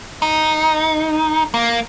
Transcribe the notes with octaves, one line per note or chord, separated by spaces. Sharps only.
D#4
A#3